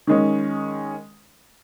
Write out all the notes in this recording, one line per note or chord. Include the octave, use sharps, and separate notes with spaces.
D#3 G#3 C#4